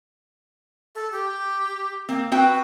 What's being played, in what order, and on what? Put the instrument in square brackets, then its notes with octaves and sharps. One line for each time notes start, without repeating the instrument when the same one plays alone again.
[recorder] A4
G4
[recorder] A#3 [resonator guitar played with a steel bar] C4
[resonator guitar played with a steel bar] C4 F#4 G5 [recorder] B4